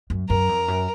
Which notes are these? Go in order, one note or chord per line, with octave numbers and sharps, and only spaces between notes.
F#2
F#2 A#4
F2
F#2